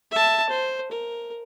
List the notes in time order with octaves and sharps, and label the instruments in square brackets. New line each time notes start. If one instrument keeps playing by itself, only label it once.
[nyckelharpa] E5 A5
C5
A#4